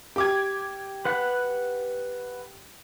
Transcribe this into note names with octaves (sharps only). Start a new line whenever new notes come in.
G4 D6 G#6
B4 F#5 F#6